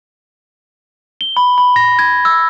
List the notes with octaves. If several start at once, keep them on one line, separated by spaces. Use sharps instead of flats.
G7
B5
B5
A#6
G#6
E6